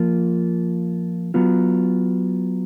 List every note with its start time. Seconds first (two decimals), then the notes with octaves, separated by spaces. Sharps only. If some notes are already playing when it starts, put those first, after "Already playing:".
Already playing: F3 A#3 F4
1.34 F#3 B3 F4